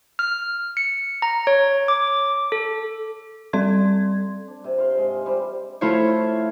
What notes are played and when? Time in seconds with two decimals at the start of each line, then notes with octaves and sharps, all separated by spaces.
0.19 F6
0.77 C#7
1.22 A#5
1.47 C#5
1.88 D6
2.52 A4
3.53 G3 C4 A4 D5 C6 G#6
4.48 D4
4.64 C3
4.78 C5 F5 C6
4.98 G#2 G#3
5.26 G3 C4 G4
5.81 A3 E4 F4 C5 C#5